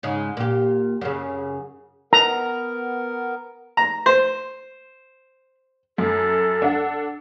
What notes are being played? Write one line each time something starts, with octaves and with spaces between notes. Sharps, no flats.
G#2 C#3 G#3
A#2 G4
F#2 C#3
B3 A#4 A#5
A#5
C5
F#2 A4
D4 F#5